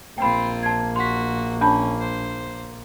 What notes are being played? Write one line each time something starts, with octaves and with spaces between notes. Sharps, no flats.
A#1 A#3 C4 F4 G5 B5
A5 G#6
F#4 C6 B6
C#4 D4 A5 B5
C5